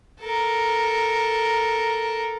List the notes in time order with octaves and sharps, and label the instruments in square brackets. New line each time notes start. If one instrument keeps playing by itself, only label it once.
[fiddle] A4 A#4